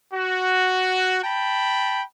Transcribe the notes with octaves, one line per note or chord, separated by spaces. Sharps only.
F#4
G5 A5 B5